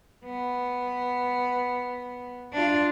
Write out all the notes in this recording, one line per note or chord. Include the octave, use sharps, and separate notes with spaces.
B3
D4 F4